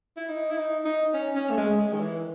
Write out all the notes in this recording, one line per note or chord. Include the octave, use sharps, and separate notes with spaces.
E4
D#4
E4
D#4
D#4
C#4
C#4
A3
G#3
G#3
D#3
E3